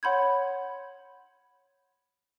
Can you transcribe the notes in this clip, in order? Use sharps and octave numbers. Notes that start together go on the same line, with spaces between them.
C#5 F#5 B5 C6 G6 G#6